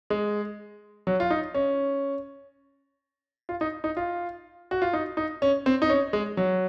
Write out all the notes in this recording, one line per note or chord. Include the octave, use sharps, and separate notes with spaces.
G#3
F#3
F4
D#4
C#4
F4
D#4
D#4
F4
F#4
F4
D#4
D#4
C#4
C4
D#4
C#4
G#3
F#3